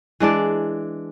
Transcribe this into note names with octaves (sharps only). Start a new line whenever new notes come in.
E3 G#3 D4 D5